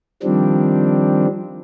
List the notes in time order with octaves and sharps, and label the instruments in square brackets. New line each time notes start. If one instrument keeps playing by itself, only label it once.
[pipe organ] D#3 F3 G3 C4 D4